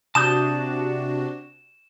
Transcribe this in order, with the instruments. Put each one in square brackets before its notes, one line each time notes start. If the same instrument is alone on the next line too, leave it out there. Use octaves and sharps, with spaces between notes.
[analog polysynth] C3 D4 F#4 [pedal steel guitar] A5 D#6 G6 [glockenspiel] E7